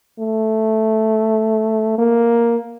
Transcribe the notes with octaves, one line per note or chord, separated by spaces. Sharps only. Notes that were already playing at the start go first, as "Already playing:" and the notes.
A3
A#3